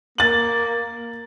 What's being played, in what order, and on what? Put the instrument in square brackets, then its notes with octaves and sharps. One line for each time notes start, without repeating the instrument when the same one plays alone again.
[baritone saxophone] A#3 [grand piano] A6 F#7